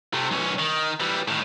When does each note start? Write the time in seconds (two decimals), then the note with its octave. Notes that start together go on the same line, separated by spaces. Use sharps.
0.14 C3 A3
0.31 B1 C#4
0.59 D#3
1.00 E3 G3
1.28 A2 D#3